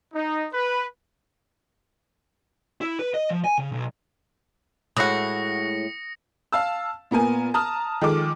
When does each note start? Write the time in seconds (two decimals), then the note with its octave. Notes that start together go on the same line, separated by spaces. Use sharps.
0.14 D#4
0.54 B4
2.81 E4
2.99 B4
3.14 D#5
3.30 F3
3.44 G#5
3.58 C#3
3.72 B1
4.97 A2 E3 G#3 F#4 D#6 A#6 C#7
6.52 F5 A5 E6
7.11 A#2 B3 A#4 G#5
7.54 A5 A#5 D#6 F6
8.01 D#3 F3 G#3 A4 D6